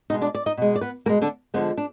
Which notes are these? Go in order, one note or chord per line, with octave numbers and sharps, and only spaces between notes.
B2 G#3 D#4 D#5
D4 D5
D5
D#4 D#5
B2 G#3
D5
B3 B4
B2 G#3 A#3 A#4
D3 D4
D3 F3 G#3 B3
D4